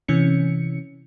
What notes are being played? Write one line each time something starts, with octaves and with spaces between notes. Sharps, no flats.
C3 E3 C#4 C#7